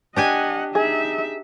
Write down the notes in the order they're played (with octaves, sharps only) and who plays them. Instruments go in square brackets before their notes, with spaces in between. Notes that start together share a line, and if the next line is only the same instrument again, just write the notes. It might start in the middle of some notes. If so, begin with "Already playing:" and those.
[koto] D4 G4 G#5 [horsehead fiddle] D#5 F#5
[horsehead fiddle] D#4 E5 [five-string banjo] G#4